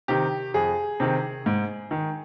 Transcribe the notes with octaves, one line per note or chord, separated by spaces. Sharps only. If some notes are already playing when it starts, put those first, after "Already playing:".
C3 D#3 G4
F2 G#4
C3 D#3
G#2
D#3